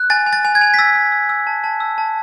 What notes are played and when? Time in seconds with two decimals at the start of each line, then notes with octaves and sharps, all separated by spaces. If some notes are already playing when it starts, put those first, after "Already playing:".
Already playing: F#6
0.10 G#5 A6
0.26 G#5
0.33 A6
0.45 G#5
0.55 G#6
0.61 G#5
0.74 B6
0.79 E6 A6
0.95 E6
1.12 E6
1.29 E6
1.47 A5
1.64 A5
1.80 E6
1.98 A5